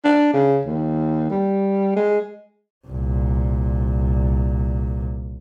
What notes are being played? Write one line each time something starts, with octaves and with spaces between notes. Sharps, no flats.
D4
C#3
D#2
G3
G#3
C2 A#2